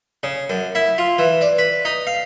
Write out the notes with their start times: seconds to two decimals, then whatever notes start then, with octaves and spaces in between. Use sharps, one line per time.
0.23 C#3
0.50 F#2
0.75 E4
0.98 F4
1.19 E3
1.41 D5
1.58 B4
1.85 D#4
2.07 F5